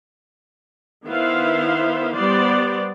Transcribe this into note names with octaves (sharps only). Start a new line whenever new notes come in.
D#3 B3 E4 C5 E5 F5
G3 B3 C5 D5